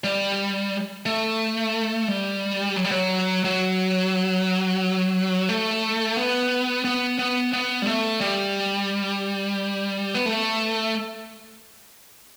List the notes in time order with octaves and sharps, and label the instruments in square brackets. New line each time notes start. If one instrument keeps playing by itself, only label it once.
[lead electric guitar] G3
A3
G3
F#3
G3
F#3
F#3
A3
B3
B3
B3
B3
G3
A3
G3
B3
A3